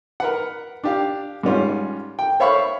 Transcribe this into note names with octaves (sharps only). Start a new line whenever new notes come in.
A#4 B4 F#5
D4 G4 F5
G#2 G3 C#4 F4
G5
C5 C#5 E5 F5 B5 C#6